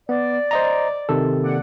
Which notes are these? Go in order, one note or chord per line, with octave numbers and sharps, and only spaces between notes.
B3 D5
C5 D#5 A#5
C3 D#3 A4
A#3 D5 F#5